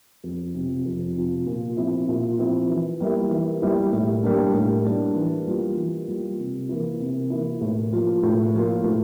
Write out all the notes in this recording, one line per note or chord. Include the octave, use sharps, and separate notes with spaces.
F2
C3 F3
F2
C3 F3
A#2
F3 C4 E4
A#2
F3 C4 E4
E3
G3 A#3 E4
E3
G3 A#3 E4
A2
G3 A#3 D4
A2
G3 A#3 D4
E3
G3 A#3 F4
E3
G3 A#3 F4
C3
E3 A#3 E4
C3
E3 A#3 E4
A2
F3 A#3 F4
A2
F3 A#3 F4
A2